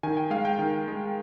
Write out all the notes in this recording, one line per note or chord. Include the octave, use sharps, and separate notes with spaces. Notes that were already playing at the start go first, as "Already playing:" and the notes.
D#3 G#5
G5
G#3 F5
G5
D#3
G#3